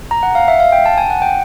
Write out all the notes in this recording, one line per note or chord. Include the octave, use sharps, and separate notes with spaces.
A#5
F#5
F5
E5
F5
G5
A5
G#5
F#5
G5